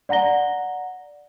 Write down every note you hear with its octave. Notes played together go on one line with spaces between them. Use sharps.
D5 F#5 A#5 A#6 G7